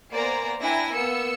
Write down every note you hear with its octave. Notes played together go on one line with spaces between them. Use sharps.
A#3 B3 C5 D5 G#5 A#5
D4 E4 G5 G#5 A#5 A#6
A#3 B3 E6 C#7